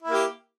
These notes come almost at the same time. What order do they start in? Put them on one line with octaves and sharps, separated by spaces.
E4 A#3 G4